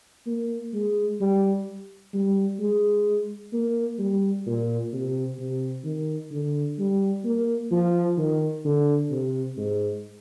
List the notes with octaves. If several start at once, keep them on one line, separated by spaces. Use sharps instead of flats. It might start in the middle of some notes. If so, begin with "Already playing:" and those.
A#3
G#3
G3
G3
G#3
A#3
G3
A#2
C3
C3
D#3
D3
G3
A#3
F3
D#3
D3
C3
G#2